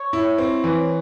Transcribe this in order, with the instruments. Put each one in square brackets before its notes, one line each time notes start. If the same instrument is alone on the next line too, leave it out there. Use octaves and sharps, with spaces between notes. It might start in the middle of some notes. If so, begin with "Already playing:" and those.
Already playing: [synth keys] C#5
[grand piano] E4
C4
E3